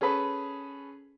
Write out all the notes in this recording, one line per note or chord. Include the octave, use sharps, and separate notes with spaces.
C#4 G#4 A4 B4